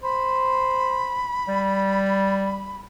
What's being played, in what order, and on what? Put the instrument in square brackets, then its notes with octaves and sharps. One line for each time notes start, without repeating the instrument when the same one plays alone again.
[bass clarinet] C5 [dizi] B5
[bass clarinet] G3